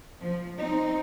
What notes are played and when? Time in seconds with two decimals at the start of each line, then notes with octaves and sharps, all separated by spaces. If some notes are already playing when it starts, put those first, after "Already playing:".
0.19 F3
0.57 C4 D#4